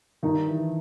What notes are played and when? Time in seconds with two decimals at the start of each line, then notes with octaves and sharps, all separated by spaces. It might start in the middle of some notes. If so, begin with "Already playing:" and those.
0.23 G2 D#3 D#4
0.48 E3